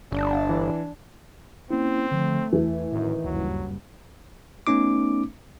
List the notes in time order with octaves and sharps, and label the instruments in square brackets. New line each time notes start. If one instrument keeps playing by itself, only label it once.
[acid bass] G1 [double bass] D4
[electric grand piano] E3
[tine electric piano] A#3 C#4 E4 [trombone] C4
[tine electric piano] D3 F3 [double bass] A3
[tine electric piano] E2 [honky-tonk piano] E3
[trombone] F#2 [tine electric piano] A2 [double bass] D#3
[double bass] F#1 G2 [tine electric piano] D2 [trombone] F#3
[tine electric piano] A3 B3 C#4 D#4 D6